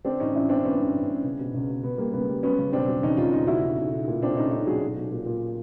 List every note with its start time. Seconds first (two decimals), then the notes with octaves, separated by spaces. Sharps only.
0.04 D3 C4 D4
0.20 A1 C#4 D#4
0.35 A1 D4 E4
0.49 D3 C4 D4
0.65 A1 B3 C#4
0.79 G2
0.94 A1
1.09 G2
1.24 C#2
1.39 B2
1.54 C#2
1.69 B2
1.83 C#2 B3
1.98 G3 A#3
2.13 C#2 B3
2.29 G3
2.43 F#3 B3 C#4
2.59 C#3
2.72 E1 C4 D4
2.88 F#3
3.03 D#2 C#4 D#4
3.17 D#2 D#4 F4
3.32 E1 D#4 F4
3.47 C#3 E4 F#4
3.62 B1
3.78 B1
3.92 B1
4.08 A#2
4.22 B1 C4 D4
4.37 B1 C#4 D#4
4.51 B1 C#4 D#4
4.67 F#3 F#4 G#4
4.81 B1
4.97 B1
5.11 A#2
5.26 A#2